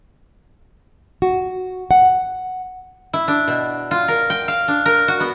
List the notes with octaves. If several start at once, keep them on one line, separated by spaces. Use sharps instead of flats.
F#4
F#5
E4
D4
B2
F4
A#4
G5
F5
D4
A#4
F#4
B3